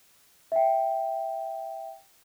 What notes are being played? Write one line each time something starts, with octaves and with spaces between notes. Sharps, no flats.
E5 G5